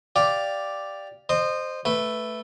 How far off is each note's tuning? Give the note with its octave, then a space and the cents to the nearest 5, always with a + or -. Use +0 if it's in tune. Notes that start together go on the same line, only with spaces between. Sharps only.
G4 +0 D5 +0 F5 +0
C5 +0 D#5 -25 C6 +0
A3 +0 B4 +0